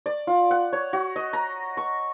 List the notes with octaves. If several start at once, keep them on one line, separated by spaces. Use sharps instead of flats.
D5
F4
F#5
C#5
F#4
D#5
A#5
C#6